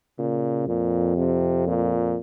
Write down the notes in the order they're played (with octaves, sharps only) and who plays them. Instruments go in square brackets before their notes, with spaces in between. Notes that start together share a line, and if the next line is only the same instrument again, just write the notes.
[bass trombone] A#2 [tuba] C#3
[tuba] F2 [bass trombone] A#2
[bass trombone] C3
A#2